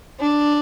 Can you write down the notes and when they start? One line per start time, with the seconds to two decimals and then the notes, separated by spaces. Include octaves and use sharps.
0.20 D4